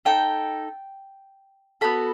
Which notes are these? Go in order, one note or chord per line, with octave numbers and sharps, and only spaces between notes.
D#4 A4 G5
B3 F#4 A4 B5